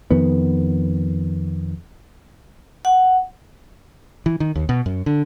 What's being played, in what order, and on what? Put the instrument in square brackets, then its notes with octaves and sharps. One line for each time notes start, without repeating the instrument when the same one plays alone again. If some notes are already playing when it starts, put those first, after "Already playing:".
[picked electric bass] F2 D#3 B3
[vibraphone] F#5
[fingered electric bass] E3
D#3
D#2
B2
F#2
D3